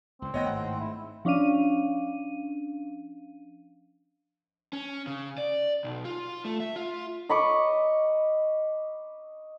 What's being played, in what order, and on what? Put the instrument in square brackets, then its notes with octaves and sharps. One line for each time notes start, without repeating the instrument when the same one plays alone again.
[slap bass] C#2 A#2 [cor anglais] C4
[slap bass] G#1 A2 A#3 [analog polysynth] B3 A#6 [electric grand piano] C#5 D#5 G5
[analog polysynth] G#2 [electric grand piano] F#5
[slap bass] A3 [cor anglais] E4
[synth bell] F3 C#4 D4 F5 D#7
[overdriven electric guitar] C#4
C#3
D5
B1
F4
A3
E5
F4
[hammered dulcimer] D#5 B5 C#6 D6